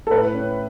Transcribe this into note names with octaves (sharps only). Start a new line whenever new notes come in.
A4
A2 B4
C#4